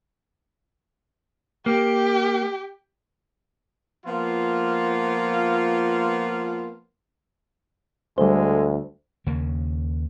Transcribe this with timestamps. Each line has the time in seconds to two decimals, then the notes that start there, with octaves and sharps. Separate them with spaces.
1.66 A#3 G4
4.06 F3 A#3 B3 F4
8.18 D2 G3 G#3 A4 C5
9.27 D#2 C#3 A#3